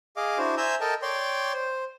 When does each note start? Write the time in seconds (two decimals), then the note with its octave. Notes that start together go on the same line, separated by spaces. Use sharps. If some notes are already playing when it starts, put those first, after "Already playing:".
0.17 G#4 D#5 F5 D6
0.38 D4 E4 F#4 C5
0.57 C5 E5 G#5 A#5 E6 G6
0.81 A4 A#4 D#5 G5 A5
1.02 C#5 D5 G5 C6
1.54 C5